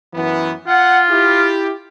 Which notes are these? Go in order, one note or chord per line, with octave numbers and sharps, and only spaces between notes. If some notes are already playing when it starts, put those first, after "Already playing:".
F#2 E3 B3
F4 F#5
E4 G4